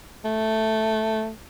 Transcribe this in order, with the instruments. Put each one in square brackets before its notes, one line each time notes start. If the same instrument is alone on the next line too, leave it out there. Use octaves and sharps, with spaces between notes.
[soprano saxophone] A3